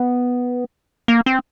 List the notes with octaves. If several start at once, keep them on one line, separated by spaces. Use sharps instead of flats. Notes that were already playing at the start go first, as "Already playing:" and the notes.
Already playing: B3
A#3
C4